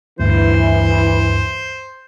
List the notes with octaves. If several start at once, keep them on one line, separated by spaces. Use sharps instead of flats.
D2 G2 E3 C5